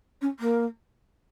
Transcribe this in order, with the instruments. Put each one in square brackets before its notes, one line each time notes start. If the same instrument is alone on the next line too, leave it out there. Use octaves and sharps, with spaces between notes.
[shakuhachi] C#4
A#3